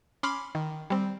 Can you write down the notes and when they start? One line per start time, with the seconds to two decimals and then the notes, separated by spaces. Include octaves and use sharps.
0.23 C#4 B5 C6 D6 F6 C7
0.55 D#3
0.90 G3 C4